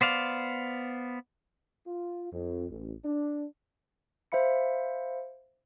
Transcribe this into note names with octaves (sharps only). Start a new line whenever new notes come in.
B3 C5 D5 F5
F4
F2
A1
D4
C5 E5 F5 B5 C#7